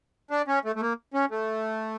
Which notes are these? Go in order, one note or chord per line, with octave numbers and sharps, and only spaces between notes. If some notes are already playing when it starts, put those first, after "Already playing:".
D4
C#4
A3
A3
A#3
C#4
A3